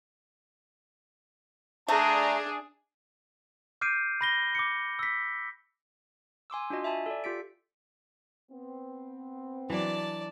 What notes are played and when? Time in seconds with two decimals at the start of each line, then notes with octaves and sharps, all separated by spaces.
1.88 A3 D4 G#4 A#5
3.81 D6 F6 G6 C7 D7 D#7
4.21 B5 A#6 G7
4.55 D6 C#7
4.99 E6 B6
6.50 G#5 C6 D6 E6
6.70 D4 F4 F#4 D#5
6.84 E5 G#5 A5 B5
7.06 A4 D5
7.24 F4 G4 B6 D7
8.52 B3 C4
9.70 E3 F#3 D4 D5 A5